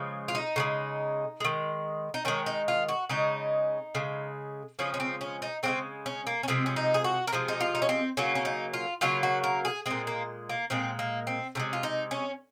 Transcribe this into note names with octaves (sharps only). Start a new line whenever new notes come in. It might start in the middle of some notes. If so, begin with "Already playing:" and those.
Already playing: C#3 F3 G#3
F4
D#4
C#3 F3 G#3
D#3 G#3
D#4
D#3 G#3 C#4
D#4
F4
F#4
C#3 G#3 D#4
C#3 G#3
C#3 F3 G#3 C#4
C#4
C4
C#4
D#4
C#3 F3 G#3 C4
C#4
A#3
C#4
C3 F3 G#3 C4
C#4
D#4
G#4
F#4
A#4
C3 F3 G#3 G#4
D#4
F4
D#4
C#4
C4
C#3 F#3 A#3 C#4
C#4
D#4
F4
C#3 F#3 A#3 F4
F#4
A#4
G#4
A#2 G#3 C4
A#3
A#3
A#2 G#3 C4
A#3
C4
C3 D#3 G#3 C#4
F4
D#4
C#4